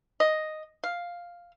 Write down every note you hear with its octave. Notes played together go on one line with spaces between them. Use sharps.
D#5
F5